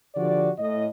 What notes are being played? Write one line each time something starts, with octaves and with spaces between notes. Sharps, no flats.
D3 F3 F#4 G4 D5
A2 D#5